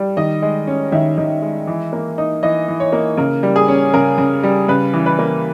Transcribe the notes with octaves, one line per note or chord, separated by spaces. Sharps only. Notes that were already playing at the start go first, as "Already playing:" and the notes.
Already playing: G3
D#3 D#5
G#3
C#4
D#3 E5
D#3
G#3
E3
A#3
D#4
E3 D#5
E3
C#5
A#3
C#3 A#4
G3
G#4
C#4
C#3 A#4
C#3
G3
C#3 B4
E3
B4
A#3